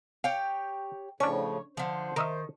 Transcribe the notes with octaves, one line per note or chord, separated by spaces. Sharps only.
G4 C#5 F5 G5
A2 C#3 F3 C#4 D4 C#5
D3 F3 C5
D#3 A#4 D#5 E5